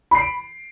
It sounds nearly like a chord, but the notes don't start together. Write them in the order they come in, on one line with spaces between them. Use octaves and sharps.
B5 C7 D7